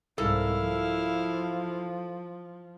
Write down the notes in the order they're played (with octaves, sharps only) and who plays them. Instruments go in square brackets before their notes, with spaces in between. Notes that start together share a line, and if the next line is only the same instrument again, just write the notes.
[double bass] C2 G#2 [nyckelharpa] E4 F5 [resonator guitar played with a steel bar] A4 A#4
[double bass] F3